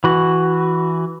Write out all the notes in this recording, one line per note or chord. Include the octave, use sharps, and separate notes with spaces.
E3 F#4